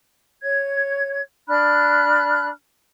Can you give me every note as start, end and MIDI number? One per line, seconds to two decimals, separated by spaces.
0.43 1.20 73
0.43 1.20 92
1.48 2.48 62
1.48 2.48 83
1.48 2.48 89
1.48 2.48 90